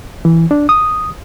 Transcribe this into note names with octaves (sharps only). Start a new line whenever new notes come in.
E3
D4
D#6